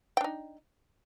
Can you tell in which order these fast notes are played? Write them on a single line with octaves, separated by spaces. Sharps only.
G5 D4 D#4